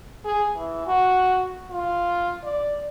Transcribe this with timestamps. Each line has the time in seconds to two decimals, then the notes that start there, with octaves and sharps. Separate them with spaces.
0.25 G#4
0.56 E3
0.87 F#4
1.71 F4
2.44 D5